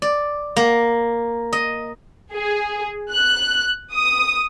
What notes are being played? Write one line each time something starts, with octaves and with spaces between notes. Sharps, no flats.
D5
A#3
D#5
G#4
F#6
D#6